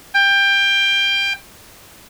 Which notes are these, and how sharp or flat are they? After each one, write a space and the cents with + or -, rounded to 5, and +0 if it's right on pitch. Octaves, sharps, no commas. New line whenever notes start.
G5 +20